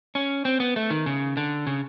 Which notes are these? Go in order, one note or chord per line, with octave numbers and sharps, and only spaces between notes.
C#4
C4
B3
A3
D#3
C#3
D3
C#3